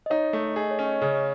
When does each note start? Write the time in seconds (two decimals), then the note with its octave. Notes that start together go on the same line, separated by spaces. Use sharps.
0.06 D#5
0.10 D#4 C#5
0.33 A3
0.56 G#4 D#5
0.71 C#5
0.79 C#4
0.86 D#5
1.02 C#3 C#5